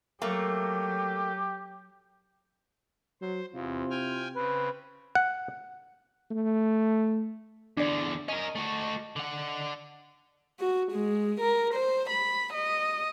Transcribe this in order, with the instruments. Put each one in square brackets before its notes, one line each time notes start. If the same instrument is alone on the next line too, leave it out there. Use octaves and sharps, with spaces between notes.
[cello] F#3 [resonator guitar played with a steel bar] A3 A#3 [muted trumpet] G4
[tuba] F#3 [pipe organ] C5
[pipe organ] E2 [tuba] C3 [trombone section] C4 E4 F4
[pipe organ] G5 G#5 F6
[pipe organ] C#3 C4 [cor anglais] B4
[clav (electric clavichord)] F#5
[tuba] A3
[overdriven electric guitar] E2 D3 [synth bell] D4 D5
[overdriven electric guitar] C#4 A#4 [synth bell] D#5
[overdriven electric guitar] A3 F#4
D3 F#5
[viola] F#4
G#3
A#4
C5
B5
D#5